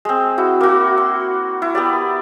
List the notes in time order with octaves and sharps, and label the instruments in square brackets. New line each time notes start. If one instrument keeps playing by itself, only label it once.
[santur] G#3 C4
E4 F#4
A#3 F#4
C6
E4
B3 G4 D5